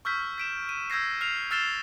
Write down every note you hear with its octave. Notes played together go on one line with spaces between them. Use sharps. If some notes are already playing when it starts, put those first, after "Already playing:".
C#6 E6 F6 G6 B6
B6 D7 E7
D#7
E6 G6 G#6 A#6 C7
F6 C7 F7
E6 F6 A6 C7 E7 G7